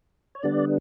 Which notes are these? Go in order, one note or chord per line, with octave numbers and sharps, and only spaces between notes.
C#5
D3 G3 B3 D4 D5